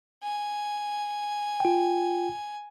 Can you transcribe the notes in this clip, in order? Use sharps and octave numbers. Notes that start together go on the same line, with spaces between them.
G#5
F4 G5